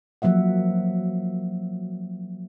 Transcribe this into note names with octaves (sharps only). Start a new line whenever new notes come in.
F3 F#3 A#3 E5 F#5